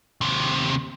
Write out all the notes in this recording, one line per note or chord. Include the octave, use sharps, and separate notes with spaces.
D#2 C3